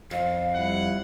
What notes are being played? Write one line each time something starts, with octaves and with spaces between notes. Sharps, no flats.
F2 F5
G3 E4 F#5